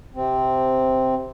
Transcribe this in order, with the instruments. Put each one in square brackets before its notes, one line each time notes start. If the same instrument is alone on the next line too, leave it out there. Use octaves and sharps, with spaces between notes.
[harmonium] C3 C4